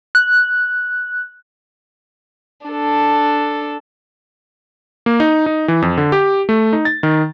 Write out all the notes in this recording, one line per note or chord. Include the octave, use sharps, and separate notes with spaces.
F#6
D4 A4
A#3
D#4
D#4
E3
F2
D3
G4
A3
D#4
A6
D#3